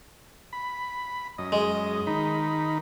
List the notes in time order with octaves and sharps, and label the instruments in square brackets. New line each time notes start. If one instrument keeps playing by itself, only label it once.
[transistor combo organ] B5
F#2 D#5
[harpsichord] G#3
[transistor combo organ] D#3 D#4 B5